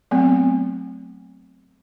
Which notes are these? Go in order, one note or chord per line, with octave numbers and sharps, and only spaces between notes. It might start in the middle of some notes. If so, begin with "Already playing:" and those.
F#3 A3 B3 C4